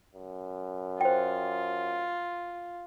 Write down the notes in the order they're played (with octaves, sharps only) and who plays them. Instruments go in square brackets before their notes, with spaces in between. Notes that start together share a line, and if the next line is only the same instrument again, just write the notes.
[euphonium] F#2
[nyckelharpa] F4 [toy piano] C5 G5